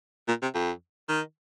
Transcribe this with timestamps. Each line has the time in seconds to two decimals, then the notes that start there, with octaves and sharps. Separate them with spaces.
0.28 A#2
0.42 C3
0.54 F2
1.08 D#3